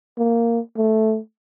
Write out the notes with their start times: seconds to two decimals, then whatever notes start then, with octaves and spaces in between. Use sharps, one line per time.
0.18 A#3
0.77 A3